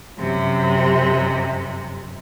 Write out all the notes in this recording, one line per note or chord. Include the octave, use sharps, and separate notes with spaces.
F#2 C3